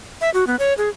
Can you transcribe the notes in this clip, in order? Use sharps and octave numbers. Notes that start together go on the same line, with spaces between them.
E5
F#4
B3
C#5
G#4